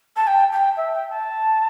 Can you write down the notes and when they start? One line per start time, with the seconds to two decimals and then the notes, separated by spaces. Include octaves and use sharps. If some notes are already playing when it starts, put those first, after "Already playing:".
0.16 A5
0.27 G5
0.52 G5
0.76 E5
0.93 G5
1.10 A5